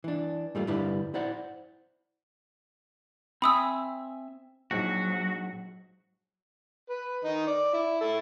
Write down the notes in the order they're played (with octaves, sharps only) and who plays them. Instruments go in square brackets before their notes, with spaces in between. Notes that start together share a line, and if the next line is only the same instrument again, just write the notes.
[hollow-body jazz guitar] E3 D4
G#2 G3 A3 F4
G2 D3 E4 G4 B4 D5
E4 C5 D5 F#5
[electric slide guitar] C4 E5 G#5 [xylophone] B5 D#6 E6
[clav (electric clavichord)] A#1 G#2 [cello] F#3 [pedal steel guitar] F#4
[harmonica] B4
D#3 D#4
D5
E4
E4 A4